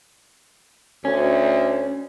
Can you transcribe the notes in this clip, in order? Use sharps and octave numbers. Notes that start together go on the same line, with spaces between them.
D2 C#4